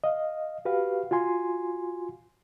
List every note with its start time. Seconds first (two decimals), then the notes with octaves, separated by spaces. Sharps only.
0.04 D#5 F5
0.65 F#4 G4 B4 F5
1.11 F4 F#4 G#5 C6